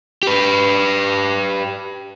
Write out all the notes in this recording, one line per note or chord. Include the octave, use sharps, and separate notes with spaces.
G4 B4